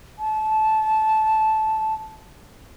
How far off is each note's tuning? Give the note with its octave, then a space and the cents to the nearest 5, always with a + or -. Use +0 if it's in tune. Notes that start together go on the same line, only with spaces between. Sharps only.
A5 -15